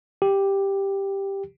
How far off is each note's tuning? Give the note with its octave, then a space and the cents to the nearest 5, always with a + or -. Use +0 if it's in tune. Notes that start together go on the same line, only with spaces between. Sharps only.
G4 +5